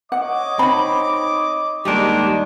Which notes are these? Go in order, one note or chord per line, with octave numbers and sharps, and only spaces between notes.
C#5 D#5 F#5 D6
C4 D#4 B5
D#2 G3 G#3 D4 D#4